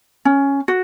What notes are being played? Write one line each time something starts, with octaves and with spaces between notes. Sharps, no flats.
C#4
F#4